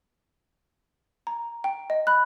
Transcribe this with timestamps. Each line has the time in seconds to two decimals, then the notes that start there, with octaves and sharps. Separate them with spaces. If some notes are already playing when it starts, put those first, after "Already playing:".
1.27 A#5
1.64 G5
1.90 D#5
2.07 B5 F#6